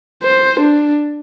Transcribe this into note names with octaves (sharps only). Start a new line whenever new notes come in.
C5
D4